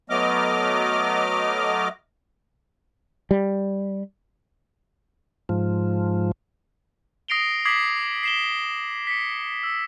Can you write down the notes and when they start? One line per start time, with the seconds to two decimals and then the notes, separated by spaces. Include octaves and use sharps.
0.10 F#3 A3 B3 D#5 D6 F6
3.31 G3
5.49 G#2 F3
7.28 D#6 A#6 C7 D7 F7 G7
7.65 D6 D#6 G#6 B6 C7 F#7
8.23 C7 E7 G7
9.07 B6 C#7
9.63 E6